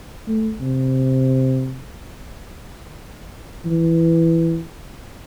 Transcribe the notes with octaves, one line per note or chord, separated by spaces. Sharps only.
A3
C3
E3